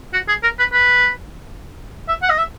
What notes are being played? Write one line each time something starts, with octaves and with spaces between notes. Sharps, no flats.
F#4
G#4
A#4
B4
B4
E5
F#5
D#5
E5